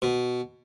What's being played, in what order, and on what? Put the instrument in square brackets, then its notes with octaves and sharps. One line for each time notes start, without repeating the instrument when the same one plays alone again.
[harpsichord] B2